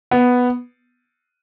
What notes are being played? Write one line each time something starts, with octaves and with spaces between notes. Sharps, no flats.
B3